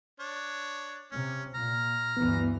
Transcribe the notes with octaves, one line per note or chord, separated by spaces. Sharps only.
D4 C#5
C3 C#4
A#2 A#5 F6
D2 G2 E3 B3